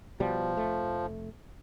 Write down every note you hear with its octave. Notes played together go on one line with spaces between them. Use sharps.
B2 F3 G3
F1 A3